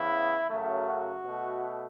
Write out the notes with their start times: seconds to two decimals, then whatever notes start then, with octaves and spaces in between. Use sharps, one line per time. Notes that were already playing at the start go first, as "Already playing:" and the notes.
Already playing: E2 C#3 E3 B3 E4
0.49 F#2 C#3 F#3 A3
0.87 F#4
1.24 B2 A3